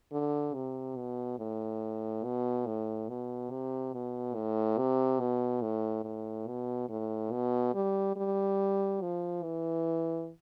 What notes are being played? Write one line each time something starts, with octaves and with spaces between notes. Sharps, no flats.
D3
C3
B2
A2
B2
A2
B2
C3
B2
A2
C3
B2
A2
A2
B2
A2
B2
G3
G3
F3
E3